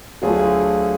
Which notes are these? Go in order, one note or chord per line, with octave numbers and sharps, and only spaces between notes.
D2 D3 F#3 A3 F4 G#4